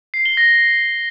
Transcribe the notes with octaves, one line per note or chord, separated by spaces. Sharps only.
C7
G7
A#6